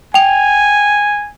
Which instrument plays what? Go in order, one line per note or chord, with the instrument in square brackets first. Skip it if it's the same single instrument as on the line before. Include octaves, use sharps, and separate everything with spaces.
[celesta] G5 F7 [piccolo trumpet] G#5